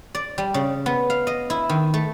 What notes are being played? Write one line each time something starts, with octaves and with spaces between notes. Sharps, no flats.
D5
G3
C#3
B3
F5
D#5
E4
D#3
A3